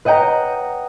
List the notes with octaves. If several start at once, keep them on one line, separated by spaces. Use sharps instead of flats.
B4 D#5 F#5 G5 A#5